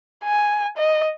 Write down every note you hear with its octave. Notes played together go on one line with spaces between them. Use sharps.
G#5
D#5